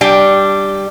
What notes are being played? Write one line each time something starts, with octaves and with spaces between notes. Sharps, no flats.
G3 D4 G5